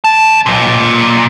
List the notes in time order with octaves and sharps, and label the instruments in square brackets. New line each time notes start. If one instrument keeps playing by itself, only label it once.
[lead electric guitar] D#2 A5
B1 A#2